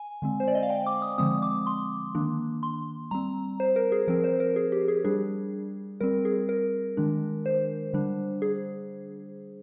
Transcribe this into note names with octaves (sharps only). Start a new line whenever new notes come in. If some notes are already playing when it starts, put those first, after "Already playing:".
Already playing: G#5
D3 G#3 C4
C5
D5
D#5
F5
G5
D6
D#6
D3 F3 G#3 C4 D#6
D6
C6
D#3 A#3 D4
C6
G3 C4 A#5
C5
A#4
G#4
F3 C4 A#4
C5
A#4
G#4
G4
G#4
G3 D4 G#4
G3 C4 A#4
G#4
A#4
D#3 G#3 D4
C5
D3 G3 D4
G#4